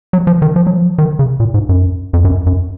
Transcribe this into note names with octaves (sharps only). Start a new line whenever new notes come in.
F#3
F3
D#3
F3
F#3
F3
D#3
C#3
A#2
G#2
F#2
F2
F#2
F#2